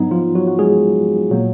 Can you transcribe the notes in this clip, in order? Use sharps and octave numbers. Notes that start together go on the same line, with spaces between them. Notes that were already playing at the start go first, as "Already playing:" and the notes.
Already playing: G#2 F#3 B3 D#4
F3 F4
F#3 F#4
F#4
G#3 G#4
A#2 F#3 A#3